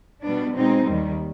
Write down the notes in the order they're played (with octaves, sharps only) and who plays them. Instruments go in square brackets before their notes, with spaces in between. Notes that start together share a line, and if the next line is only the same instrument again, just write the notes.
[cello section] B2 G3 B3 D4
B2 G#3 C4 D#4
D#2 D#3 G3